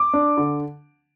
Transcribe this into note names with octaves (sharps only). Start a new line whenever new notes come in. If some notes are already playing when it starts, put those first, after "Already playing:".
Already playing: D6
D4
D3